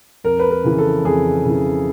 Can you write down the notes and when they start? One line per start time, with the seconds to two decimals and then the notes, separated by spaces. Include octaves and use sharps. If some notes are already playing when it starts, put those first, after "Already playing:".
0.24 F2 A#4
0.39 B4
0.51 A#4
0.64 C#3 E3
0.78 A4
1.04 F2 G#4
1.45 C#3 E3